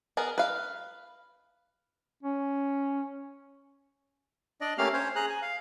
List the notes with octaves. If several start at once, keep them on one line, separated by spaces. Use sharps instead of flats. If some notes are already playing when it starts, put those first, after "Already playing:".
B3 G#4 A#4
B4 F5
C#4
D4 D5 D#5
A3 A#3 C#4 G4 F5 F6
C#4 C5 C#5
G#4 A#5 F#6
G#5
F5